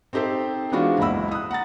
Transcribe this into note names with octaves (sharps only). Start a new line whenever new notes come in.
C4 D#4 G4 A4 C5
E3 G#3 B3 D4 F4 F#4
F#1 C#2 E4 F#5 B5 E6
D#6 F#6
F#5 A#5 A6